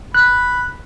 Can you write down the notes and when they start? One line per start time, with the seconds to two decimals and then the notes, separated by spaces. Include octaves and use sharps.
0.15 B5 F#6